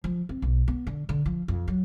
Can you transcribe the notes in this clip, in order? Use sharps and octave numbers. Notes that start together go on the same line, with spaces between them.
F3
C4
B1
B3
D3
D3
F3
F2
F#3